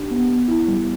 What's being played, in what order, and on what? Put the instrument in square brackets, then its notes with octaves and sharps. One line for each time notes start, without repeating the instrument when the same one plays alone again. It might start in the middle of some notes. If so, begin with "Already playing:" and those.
Already playing: [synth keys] D4 G4
B3
B3
E4
G3